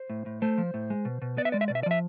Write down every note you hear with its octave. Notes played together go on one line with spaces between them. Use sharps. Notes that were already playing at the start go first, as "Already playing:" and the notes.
Already playing: C5
A2
A2
A3 C5
F3
A2
G#3
B2
B2
B3 D5
E5
G#3 D5
E5
B2 D5
E5
D5
F3 E5